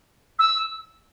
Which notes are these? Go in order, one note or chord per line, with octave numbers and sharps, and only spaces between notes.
E6